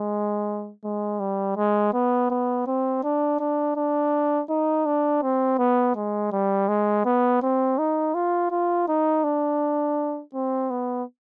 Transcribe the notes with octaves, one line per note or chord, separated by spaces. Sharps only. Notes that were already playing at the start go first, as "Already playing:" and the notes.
Already playing: G#3
G#3
G3
G#3
B3
B3
C4
D4
D4
D4
D#4
D4
C4
B3
G#3
G3
G#3
B3
C4
D#4
F4
F4
D#4
D4
C4
B3